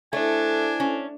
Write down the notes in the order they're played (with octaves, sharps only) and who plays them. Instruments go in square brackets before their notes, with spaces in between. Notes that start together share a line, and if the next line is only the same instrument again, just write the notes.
[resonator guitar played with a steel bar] A3 [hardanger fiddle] D4 [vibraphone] E4 A4 C5 [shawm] G#5
[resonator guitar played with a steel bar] C#4